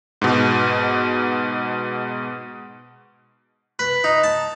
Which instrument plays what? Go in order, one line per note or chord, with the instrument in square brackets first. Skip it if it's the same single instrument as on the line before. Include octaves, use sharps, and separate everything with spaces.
[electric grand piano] G#2 B2
[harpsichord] B4
D#4
A5